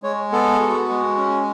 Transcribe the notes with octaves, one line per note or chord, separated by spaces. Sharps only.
G#3 C#5
B3 A4
F#4
G#3
C#4